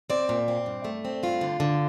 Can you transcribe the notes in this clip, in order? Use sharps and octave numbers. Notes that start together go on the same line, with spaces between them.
C4 D5
A#2
C4
G2
A3
C4
G2 F4
D3
D3